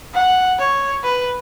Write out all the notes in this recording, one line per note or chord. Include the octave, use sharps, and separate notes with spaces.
F#5
C#5
B4